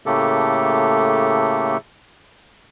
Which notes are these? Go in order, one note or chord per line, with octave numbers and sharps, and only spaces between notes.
A2 C#3 A3 A#3 G4 A4